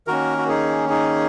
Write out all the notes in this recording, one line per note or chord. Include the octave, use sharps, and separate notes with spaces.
D#3 A#3 C#4 F#4 A#4
F#4
D#4 G#4
D#4 G#4